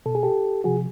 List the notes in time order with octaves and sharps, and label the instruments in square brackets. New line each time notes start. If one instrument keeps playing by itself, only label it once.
[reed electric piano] B2 A4
G#4
G4 A4
C3 F3 F#4 G#4